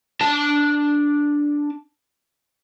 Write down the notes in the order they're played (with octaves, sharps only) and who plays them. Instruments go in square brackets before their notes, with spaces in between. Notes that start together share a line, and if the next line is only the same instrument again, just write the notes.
[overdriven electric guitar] D4 A5